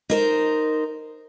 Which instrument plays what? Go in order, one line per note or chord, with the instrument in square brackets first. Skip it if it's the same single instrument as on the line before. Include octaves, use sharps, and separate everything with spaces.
[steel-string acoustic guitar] D#4 A#4 C5